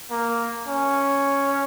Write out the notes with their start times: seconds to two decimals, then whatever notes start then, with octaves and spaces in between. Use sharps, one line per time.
0.11 A#3
0.68 C#4